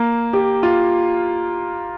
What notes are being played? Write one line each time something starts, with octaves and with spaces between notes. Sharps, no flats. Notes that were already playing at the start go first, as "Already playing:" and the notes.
Already playing: A#3
G4
F4